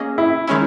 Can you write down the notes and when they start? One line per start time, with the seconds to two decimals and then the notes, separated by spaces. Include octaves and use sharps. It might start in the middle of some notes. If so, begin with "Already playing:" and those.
Already playing: A#3 C#4 G#4 D#5
0.18 E4
0.47 D#3 G#3 C#4 E4